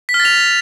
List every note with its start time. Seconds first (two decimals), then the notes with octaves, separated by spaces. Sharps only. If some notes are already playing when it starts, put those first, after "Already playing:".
0.09 B6
0.14 F6
0.20 A6
0.25 F7